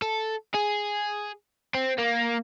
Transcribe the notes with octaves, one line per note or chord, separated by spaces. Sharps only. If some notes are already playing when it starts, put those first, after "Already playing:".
A4
G#4
C4
A#3